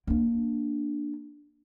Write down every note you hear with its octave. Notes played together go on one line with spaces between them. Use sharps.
A#3 D4